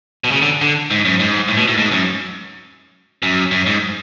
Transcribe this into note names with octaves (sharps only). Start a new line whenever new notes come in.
B2
C#3
D3
D3
G#2
F#2
G#2
A2
B2
A2
G#2
F#2
F#2
F#2
G#2